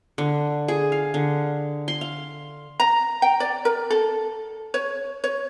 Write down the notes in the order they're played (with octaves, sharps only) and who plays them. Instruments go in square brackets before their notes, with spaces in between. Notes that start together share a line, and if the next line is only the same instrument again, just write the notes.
[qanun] D3
G#4
F5
D3
C6
F5
[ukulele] A#5
G5
D5
A#4
A4
C#5
C#5